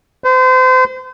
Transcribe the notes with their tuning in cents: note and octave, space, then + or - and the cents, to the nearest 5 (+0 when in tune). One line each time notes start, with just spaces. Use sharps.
C5 -35